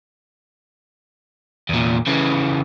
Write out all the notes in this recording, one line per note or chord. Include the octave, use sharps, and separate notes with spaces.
E2 A#2
C#3 E3